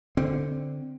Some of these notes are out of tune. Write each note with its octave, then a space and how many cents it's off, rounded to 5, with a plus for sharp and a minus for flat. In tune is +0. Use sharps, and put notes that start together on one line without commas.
D3 +0 C4 -5